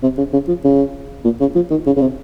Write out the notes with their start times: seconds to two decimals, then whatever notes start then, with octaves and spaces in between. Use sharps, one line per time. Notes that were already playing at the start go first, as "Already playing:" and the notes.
0.03 C3
0.18 C#3
0.33 C#3
0.48 F3
0.64 C#3
1.24 A#2
1.40 C#3
1.55 F3
1.71 D#3
1.86 C#3
1.97 C#3
2.01 C3